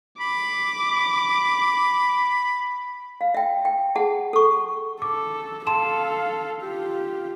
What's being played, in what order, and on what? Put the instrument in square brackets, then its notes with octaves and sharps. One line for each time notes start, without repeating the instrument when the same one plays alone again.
[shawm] B5 [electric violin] D6
[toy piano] F5
E5 G5
G5
G#4 F#5 A5
A4 C#6
[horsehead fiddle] A4 [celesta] D6
[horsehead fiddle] A4 F5 [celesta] A5 C6 E7
[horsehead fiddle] F4 G4